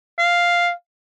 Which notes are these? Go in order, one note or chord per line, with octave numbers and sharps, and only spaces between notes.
F5